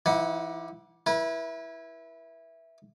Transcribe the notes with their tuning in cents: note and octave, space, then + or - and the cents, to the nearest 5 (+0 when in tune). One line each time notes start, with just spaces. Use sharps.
E3 +35 E4 -40 F#5 +0
E4 +0 B4 -35